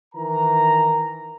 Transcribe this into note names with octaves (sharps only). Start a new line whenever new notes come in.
D#3 E3 A#4 A#5